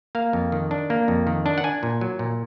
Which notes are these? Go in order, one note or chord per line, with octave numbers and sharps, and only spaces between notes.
A#3 F5
F2
D#3
D4
A#3
F2
D#3
D4
F#5
D4 G#5
A#2
F#3
A#2